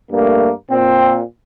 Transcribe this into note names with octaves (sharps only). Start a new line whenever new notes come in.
G2 A3 A#3
A#2 C4